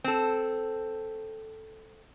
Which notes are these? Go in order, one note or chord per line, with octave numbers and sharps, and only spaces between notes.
C4 A4